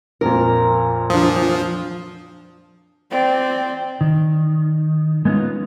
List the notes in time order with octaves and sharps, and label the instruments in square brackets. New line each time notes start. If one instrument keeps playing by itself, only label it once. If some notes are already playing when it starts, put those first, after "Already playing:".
[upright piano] F2 A#2 [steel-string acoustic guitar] A#4
[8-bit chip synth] F3 [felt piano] D4 D#6
[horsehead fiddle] C4 D5
[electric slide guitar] D#3
G#3 A3 B3 C#4 D#4 F4